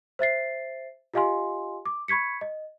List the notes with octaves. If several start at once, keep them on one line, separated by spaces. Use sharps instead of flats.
C5 E5 A6 C7
F4 G4 D#5 F5 G#5 C6
D6
B5 C#6 G#6 B6 C#7
D#5